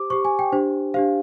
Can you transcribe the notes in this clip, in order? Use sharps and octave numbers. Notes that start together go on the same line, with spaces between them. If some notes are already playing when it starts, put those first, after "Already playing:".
Already playing: G4 C5 D6
G4 C5 C#6
G#5
G5
D4 G4 C5
D4 G4 C5 F5